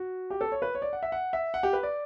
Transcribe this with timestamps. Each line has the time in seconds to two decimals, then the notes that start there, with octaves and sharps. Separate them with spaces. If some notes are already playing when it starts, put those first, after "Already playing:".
Already playing: F#4
0.30 G4
0.41 A4
0.52 C#5
0.62 B4
0.75 C#5
0.82 D5
0.93 F#5
1.02 E5
1.12 F#5
1.33 E5
1.54 F#5
1.63 G4
1.73 B4
1.83 D5